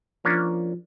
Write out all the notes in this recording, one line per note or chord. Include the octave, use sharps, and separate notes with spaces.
F3 A#3 C#4 D4